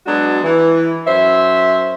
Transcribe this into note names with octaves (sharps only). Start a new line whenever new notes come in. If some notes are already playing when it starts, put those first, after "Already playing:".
F#3 G#3 B3 D4 F#4
E3
F#2 C5 E5